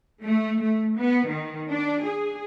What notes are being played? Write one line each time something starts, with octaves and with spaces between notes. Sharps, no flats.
A3
A3
B3
D#3
D4
G#4